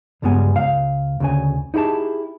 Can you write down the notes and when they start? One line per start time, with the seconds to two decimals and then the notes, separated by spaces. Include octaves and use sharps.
0.22 C#2 G2 G3 G#3 B3 G#5
0.54 C#2 F5
1.20 D2 C#3 G#5
1.74 D#4 E4 G4 G#4 A5